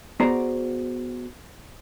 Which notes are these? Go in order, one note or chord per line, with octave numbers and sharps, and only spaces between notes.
B3 F#4 G#4 C5 D5 A#5